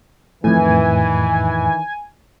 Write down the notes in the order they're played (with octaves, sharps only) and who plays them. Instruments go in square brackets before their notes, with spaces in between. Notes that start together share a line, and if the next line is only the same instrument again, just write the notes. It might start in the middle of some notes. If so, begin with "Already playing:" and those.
[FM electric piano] F2 A2 [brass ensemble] D#3 E3 [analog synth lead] G#5